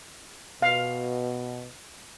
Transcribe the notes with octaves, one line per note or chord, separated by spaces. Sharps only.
B2 F5